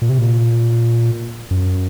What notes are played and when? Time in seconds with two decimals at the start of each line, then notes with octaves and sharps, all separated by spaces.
0.02 A#2
0.09 C3
0.18 A#2
1.51 F#2